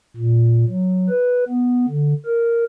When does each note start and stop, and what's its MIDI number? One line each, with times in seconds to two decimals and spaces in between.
0.16 0.65 46
0.69 1.09 54
1.09 1.44 71
1.48 1.86 59
1.88 2.14 50
2.26 2.64 70